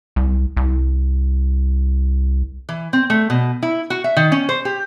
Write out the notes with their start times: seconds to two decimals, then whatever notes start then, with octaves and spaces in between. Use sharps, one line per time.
0.16 C2
0.57 C2
2.69 E3
2.93 C4
3.10 A3
3.30 B2
3.63 E4
3.90 F#4
4.04 E5
4.17 D#3
4.32 C#4
4.49 C5
4.65 G4